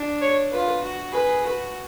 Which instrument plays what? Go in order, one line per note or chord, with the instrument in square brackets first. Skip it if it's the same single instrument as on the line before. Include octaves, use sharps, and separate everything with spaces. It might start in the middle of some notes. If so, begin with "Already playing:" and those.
Already playing: [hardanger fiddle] D4
[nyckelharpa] C#5
[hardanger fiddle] F4 [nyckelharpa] B4
[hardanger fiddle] F#4
[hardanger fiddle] G#4 [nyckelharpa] B4
[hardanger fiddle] F#4